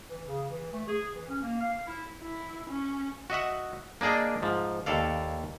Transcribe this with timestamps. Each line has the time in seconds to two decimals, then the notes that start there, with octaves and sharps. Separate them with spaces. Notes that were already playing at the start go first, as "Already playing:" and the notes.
0.09 E3
0.27 C#3
0.50 E3
0.72 A3
0.87 G#4
1.16 E3
1.28 C#4
1.43 A#3
1.60 F5
1.87 E4
2.22 E4
2.70 C#4
3.30 F#4 D#5 E5 F#5
4.01 A#3 D4 G#4 D5 D#5
4.42 G#2 F3
4.86 D#2 A4 D5 F5